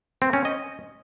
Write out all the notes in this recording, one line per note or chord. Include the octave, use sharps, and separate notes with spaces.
C4
C#4
D#5